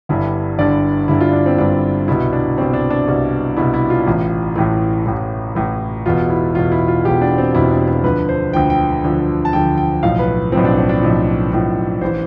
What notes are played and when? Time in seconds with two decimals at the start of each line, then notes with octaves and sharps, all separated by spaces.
0.09 G1 G2 D3 E4
0.58 G1 G2 D3 D5
1.08 G1 G2 D3 E4
1.21 F4
1.33 D4
1.46 C4
1.58 G1 G2 D3 D4
2.08 C2 B2 E4
2.33 D4
2.58 C2 B2 C4
2.73 D4
2.90 D4
3.08 C2 B2
3.57 C2 B2 E4
3.74 E4
3.90 F4
4.07 A1 A2 E3
4.56 A1 A2 E3
5.06 A1 A2 E3
5.55 A1 A2 E3
6.06 E1 E2 B2 F4
6.30 E4
6.55 E1 E2 B2 F4
6.72 E4
6.88 F4
7.05 E1 E2 B2 G4
7.21 D4
7.38 C4
7.54 E1 E2 B2 E4
7.71 D4
7.88 E4
8.03 D2 D3 F3 B4
8.29 C5
8.53 D2 D3 F3 G5
8.70 G5
9.04 D2 D3 F3
9.45 A5
9.53 D2 D3 F3 G5
9.78 G5
10.03 B1 A2 F3 F5
10.19 B4
10.52 B1 A2 F3 C4
10.65 D4
10.77 C4
10.89 D4
11.02 B1 A2 F3
11.52 B1 A2 F3
12.01 A1 E3 C5